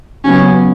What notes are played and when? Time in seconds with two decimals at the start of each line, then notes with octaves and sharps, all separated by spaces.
0.24 C#3 F#3 B3 C#4